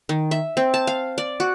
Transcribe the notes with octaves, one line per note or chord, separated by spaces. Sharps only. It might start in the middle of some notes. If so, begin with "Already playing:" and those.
D#3
E5
C4
A5
F5
D5
F#4